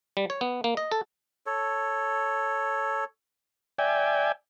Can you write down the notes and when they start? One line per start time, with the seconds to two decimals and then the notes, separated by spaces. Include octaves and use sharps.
0.17 G3
0.30 C#5
0.41 B3
0.64 A#3
0.77 D#5
0.91 A4
1.46 A4 C#5
3.79 D5 E5 G5 G#5